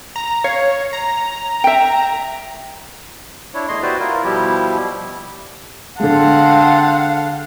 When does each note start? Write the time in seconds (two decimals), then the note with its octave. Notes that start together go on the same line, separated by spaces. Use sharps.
0.16 A#5
0.44 C#5 F5
0.93 A#5
1.64 E5 G5
3.54 D4 E4 C#5
3.68 E2 A3 D#5 C6
3.82 E4 F#4 G4 B4 C5 D5
4.00 E4 F4 A#4
4.24 B2 F3 G3 E4 G4
6.00 D3 G#3 C4 F5 F#5 A5